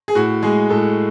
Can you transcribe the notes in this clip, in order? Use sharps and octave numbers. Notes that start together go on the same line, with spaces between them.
G#4
A2 F#4
G#3 G#4
A2 A4